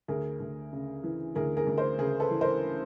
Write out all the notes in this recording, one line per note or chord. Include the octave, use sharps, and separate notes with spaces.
D2 G#4 A#4
D2
C#3
E3
D2 G#4 A#4
G#4 A#4
D2
A#4 C5
C#3 G#4 A#4
A4 B4
E3
A#4 C5